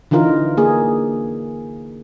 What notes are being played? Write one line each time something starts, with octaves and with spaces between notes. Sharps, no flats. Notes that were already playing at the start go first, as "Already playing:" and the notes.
D3 E3 D#4 F4 A#4
A#3 G#4